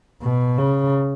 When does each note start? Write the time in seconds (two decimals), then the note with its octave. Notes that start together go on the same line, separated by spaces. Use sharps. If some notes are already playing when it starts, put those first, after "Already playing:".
0.22 B2
0.58 C#3